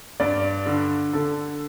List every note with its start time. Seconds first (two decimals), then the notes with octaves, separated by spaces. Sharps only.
0.20 G2 D5
0.66 D3
1.13 D3 A4